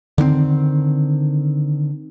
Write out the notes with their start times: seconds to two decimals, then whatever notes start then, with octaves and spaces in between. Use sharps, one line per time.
0.18 D3 D#3 B3 C4